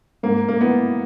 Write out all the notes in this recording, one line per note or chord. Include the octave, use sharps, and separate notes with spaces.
G#2 A#3
A#3
E3 B3